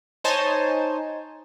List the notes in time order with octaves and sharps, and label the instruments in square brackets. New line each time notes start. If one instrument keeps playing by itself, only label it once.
[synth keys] D#4 C5 C#5 G#5 A5